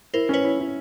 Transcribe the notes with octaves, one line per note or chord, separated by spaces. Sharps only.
E4 A#4 C5
C#4 B4 C#5
E4
E4